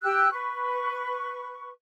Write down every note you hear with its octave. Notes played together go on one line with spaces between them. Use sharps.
G4 E6 F#6
B4 C#6